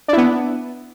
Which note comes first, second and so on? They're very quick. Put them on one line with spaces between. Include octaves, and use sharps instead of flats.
D4 E4 B3